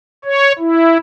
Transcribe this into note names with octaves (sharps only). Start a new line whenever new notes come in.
C#5
E4